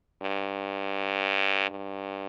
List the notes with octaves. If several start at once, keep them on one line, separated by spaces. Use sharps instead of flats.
G2
G2